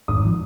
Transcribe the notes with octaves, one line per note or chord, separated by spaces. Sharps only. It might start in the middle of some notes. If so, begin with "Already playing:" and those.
G#1 D#6
F3